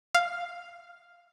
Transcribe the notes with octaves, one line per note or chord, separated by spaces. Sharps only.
F5